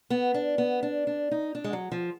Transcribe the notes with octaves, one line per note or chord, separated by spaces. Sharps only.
B3
D4
B3
D4
D4
D#4
D4
G#3
F#3
F3